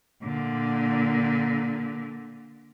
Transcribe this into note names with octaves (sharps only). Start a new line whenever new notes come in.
A#2 D3